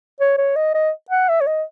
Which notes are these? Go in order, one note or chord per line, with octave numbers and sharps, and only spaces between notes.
C#5
C#5
D#5
D#5
F#5
E5
C#5
D#5